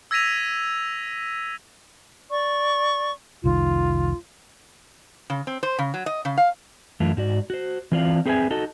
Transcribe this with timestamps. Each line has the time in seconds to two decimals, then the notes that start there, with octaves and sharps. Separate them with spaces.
0.11 E6 G#6 A#6 B6 D#7 F7
2.30 D5 C#6
3.44 F1 C2 D#3 F4
5.30 C#3
5.47 C4
5.63 C5
5.79 C#3
5.94 F#3
6.06 D#5
6.25 C#3
6.37 F5
7.00 F#2 E3 A3 F4
7.17 G#2 F#4 D5
7.50 F#4 C5
7.92 E3 C4 F4 D5 F5
8.26 C4 G#4 B4 D#5 E5 G#5
8.50 D#4 F#4 A4 D#5